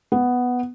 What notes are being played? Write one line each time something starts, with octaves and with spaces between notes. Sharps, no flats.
B3